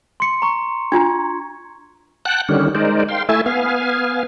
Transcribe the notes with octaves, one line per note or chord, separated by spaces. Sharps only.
C6 C#7
A#5 C#6
D4 F4 A#5 G#6
F#5 G5 A5 F#6
D3 D#3 G3 C#4
G#3 D#4 A#4 C5 D5
F5 G5 C6
A3 E4 E5 G#5 A6
B3 F5 G#5